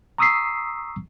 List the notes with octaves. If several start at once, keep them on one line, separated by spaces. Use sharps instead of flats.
A#5 C#6 D#6 E6 B6 C7